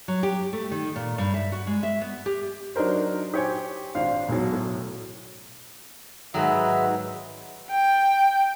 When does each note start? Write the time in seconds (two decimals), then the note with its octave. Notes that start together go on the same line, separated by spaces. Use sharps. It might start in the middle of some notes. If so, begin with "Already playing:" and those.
0.08 F#3
0.23 G4
0.53 A3
0.72 D#3
0.96 A#2
1.18 G2
1.34 E5
1.52 F#4
1.67 G#3
1.83 E5
2.01 B3
2.26 G4
2.76 F#3 D4 D#4 A#4 C5
3.34 G4 C5 C#5 G5 G#5
3.95 G#1 D4 F4 C5 F5
4.28 E1 B1 F#3
4.53 A2
6.34 G#2 D#3 E3 F#3 B4 E5 F#5
7.71 G5